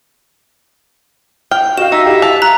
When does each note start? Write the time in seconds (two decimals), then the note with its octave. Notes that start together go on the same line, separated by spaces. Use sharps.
1.51 G5 F6
1.78 F#4 D#5 F5 E7
1.92 D#4 E5
2.06 E4 G4 F5
2.22 A5 F7
2.42 A#5 F#6